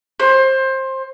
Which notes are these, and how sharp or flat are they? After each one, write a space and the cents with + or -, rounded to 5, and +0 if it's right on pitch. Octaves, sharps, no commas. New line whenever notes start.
C5 +20